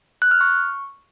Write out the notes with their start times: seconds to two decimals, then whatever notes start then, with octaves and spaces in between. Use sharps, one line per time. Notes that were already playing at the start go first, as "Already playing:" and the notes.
0.22 F#6
0.31 F6
0.41 C#6